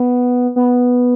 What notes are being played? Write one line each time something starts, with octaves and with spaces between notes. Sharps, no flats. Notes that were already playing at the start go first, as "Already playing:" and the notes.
Already playing: B3
B3